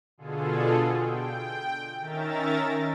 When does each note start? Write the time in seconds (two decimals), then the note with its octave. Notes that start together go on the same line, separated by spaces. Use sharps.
0.18 B2 D3 F4 G#4 A4
0.98 G5
2.01 D#3 C#4 A#4 E5 A#5 A6